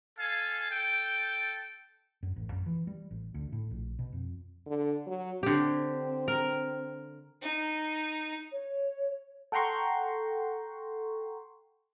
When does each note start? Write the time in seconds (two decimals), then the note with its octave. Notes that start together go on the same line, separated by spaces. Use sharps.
0.19 A4 F5 G#5
0.70 A4 G5
2.23 F#2
2.36 A1
2.52 F#2
2.66 E3
2.87 G3
3.11 A1
3.34 D2
3.52 A2
3.71 A#1
3.99 B2
4.12 F2
4.67 D3
5.07 F#3
5.43 D3 C4 G4
6.28 A#4
7.43 D#4
8.52 C#5
9.52 A4 F#5 G5 A#5 C6 C#6